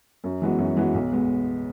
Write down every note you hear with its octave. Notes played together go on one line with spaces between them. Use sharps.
F#2
E3 G#3 B3 F#4
F#2
E3 G#3 B3 F#4
B1
G#3 B3